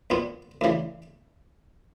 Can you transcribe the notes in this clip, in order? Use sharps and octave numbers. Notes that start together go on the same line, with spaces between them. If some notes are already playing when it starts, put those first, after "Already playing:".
A#1 A#2 B3
D2 C#3 E3